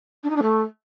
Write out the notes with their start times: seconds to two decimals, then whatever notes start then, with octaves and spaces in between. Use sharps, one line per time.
0.24 D4
0.30 D#4
0.36 D4
0.43 A3